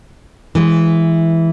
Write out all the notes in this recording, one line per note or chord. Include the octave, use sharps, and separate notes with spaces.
E3 G#3